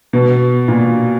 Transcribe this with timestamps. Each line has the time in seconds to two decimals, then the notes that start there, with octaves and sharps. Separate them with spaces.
0.13 B2
0.68 A#2